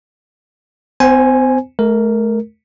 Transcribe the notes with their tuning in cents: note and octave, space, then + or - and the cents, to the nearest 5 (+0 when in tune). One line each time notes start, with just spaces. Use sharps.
C4 -45 C5 +0 G#5 +0
A3 -35 A#4 +0